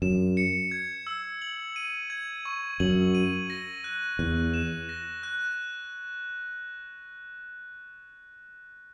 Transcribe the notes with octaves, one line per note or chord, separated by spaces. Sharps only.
F#2 E7
C#7
G#6
E6
F#7
D#7
G#6
C#6
F#2 F#7
D#7
A#6
F#6
E2 F#6
E7
A#6
F#6